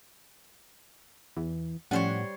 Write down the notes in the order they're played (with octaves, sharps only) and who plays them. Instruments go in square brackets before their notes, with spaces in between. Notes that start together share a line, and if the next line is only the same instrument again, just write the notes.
[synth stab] E2 [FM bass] E3
[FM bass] A2 [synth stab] F3 C#4 F#5 [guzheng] G3 C5 C#5